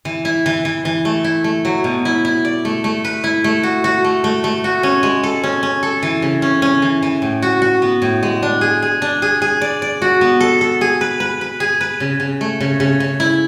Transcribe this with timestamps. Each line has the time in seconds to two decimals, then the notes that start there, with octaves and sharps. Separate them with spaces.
0.05 E3
0.25 E4
0.46 E3
0.65 E3
0.85 E3
1.05 A3
1.24 E4
1.44 A3
1.65 F#3
1.84 B2
2.05 E4
2.25 E4
2.45 D5
2.65 A3
2.84 A3
3.05 B4
3.24 E4
3.44 A3
3.63 F#4
3.84 F#4
4.04 A3
4.24 A3
4.44 A3
4.64 F#4
4.83 C#4
5.03 G#3
5.24 A4
5.43 C#4
5.63 C#4
5.83 A4
6.03 E3
6.22 C#3
6.42 C#4
6.62 C#4
6.82 E3
7.03 E3
7.22 A2
7.43 F#4
7.62 F#4
7.82 B3
8.02 A2
8.23 G#3
8.43 D4
8.61 G#4
8.82 G#4
9.02 D4
9.22 G#4
9.42 G#4
9.61 D5
9.82 D5
10.02 F#4
10.21 B3
10.41 A4
10.61 A4
10.81 G#4
11.01 B4
11.20 B4
11.41 B4
11.60 G#4
11.81 B4
12.00 C#3
12.20 C#3
12.41 A3
12.61 C#3
12.80 C#3
13.00 C#3
13.20 E4